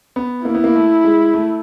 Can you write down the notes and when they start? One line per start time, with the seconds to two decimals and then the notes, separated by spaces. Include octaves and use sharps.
0.16 B3
0.45 A#3 E4
0.55 B3
0.64 A#3
0.75 A3
1.04 G#3
1.34 A3